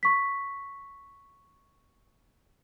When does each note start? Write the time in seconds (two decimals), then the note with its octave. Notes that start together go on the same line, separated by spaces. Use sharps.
0.03 C#6 B6